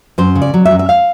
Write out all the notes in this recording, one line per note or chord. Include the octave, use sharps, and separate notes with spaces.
F#2 C5
C#3
D5
F#3
E5
F#2
E5
F5